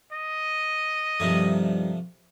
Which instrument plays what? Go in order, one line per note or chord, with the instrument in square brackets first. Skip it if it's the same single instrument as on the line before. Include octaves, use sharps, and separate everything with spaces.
[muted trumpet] D#5
[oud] G2 D#3 [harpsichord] C3 F3 A3